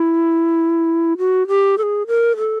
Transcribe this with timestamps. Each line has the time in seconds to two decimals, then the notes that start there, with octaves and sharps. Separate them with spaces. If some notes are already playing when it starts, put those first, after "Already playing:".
Already playing: E4
1.18 F#4
1.48 G4
1.78 A4
1.83 G#4
2.07 A#4
2.37 A4